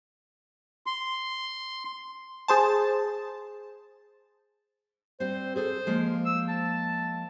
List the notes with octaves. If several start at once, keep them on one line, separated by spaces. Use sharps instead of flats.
C6
G#4 C5 A5
G3 C4 C5
G#4 A4 C5
F3 G#3 A#3
E6
A5